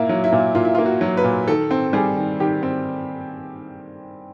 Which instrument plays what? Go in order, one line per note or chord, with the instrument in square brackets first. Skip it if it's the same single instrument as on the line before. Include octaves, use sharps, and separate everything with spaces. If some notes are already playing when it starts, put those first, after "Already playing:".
Already playing: [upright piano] A#2 A#3 E4
F#3
E4
A#2
A#2 F4
E4
F4
A#3
F#4
F#3
B4
A#2
D#3 A4
C4
G3 G#4
D#3
D#3 G4
C4